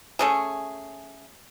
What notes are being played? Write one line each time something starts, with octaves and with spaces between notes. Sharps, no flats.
A3 C#4 G#4